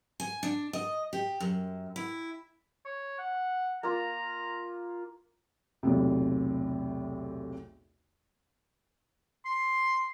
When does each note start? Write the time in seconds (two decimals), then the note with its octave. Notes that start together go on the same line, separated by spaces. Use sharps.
0.20 G#5
0.43 D4
0.73 D#5
1.13 G4
1.40 F#2
1.96 E4
2.85 C#5
3.19 F#5
3.83 A#3 F4 A#5
5.83 B1 E2 A2 C3
9.45 C6